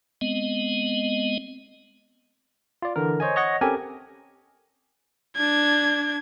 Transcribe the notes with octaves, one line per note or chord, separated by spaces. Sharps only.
G#3 B3 C4 D#5
F4 D5
D3 E3 A#4
C5 C#5 D#5 G#5
C#5 D#5 F#5 A#6
C4 C#4 G4 A4 A#4 G#5
D4 G#6